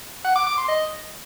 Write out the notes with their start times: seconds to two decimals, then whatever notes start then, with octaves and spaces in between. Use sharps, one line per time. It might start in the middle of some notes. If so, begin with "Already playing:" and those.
0.25 F#5
0.36 D6
0.47 D6
0.58 C6
0.68 D#5